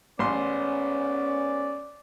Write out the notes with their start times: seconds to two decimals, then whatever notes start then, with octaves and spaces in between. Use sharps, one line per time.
0.19 A1 G#2 B3 C#4 D5 C6